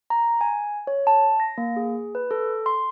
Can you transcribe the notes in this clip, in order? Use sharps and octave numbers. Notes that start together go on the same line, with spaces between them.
A#5
G#5
C#5
A5
A#6
A#3
G#4
B4
A4
C6